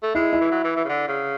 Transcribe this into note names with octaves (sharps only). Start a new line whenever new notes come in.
A3
G#3 E4
E4
E3
F#3
E3
E3
C#3
D3
C#3